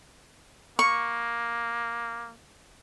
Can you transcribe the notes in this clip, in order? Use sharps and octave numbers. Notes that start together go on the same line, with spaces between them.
A#3 C#6